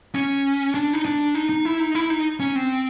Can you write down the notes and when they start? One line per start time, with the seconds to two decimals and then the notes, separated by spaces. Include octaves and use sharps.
0.15 C#4
0.74 D4
0.93 D#4
1.05 D4
1.35 D#4
1.49 D#4
1.65 E4
1.80 D#4
1.95 E4
2.10 D#4
2.40 C#4
2.56 C4